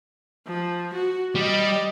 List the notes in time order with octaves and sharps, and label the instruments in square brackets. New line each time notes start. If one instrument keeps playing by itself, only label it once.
[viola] F3
F#4
[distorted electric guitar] G3 [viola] D5 D#5